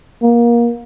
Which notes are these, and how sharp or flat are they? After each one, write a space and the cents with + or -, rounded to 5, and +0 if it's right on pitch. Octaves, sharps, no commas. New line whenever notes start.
A#3 +20